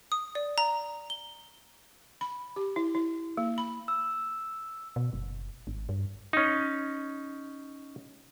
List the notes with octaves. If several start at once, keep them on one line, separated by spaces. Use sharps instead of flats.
D#6
D5
A#5
G7
B5
G4
E4
E4
A#3
B5
E6
B2
F#1
G#1
G2
C#4 D#4